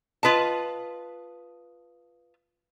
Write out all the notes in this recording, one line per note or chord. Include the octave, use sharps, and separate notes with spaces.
F4 B4 D#5 A5